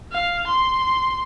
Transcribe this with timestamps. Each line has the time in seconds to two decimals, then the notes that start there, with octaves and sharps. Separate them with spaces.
0.12 F5
0.47 C6